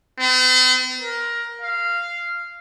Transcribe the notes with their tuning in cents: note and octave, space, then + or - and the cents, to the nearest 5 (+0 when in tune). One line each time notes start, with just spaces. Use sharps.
C4 -45
A#4 +15
F5 -10